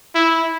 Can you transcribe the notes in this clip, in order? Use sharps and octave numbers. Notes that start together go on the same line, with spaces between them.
E4